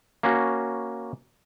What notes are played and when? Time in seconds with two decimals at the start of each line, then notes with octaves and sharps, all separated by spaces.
0.23 A#3 C#4 F#4